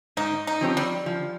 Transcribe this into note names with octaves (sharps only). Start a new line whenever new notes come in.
G#2 D#4
D#4
F3 C4 G4 C#5
G3
F3